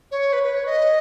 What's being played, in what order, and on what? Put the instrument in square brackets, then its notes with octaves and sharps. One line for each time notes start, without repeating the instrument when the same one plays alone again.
[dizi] C#5
B4
B4
C#5
D#5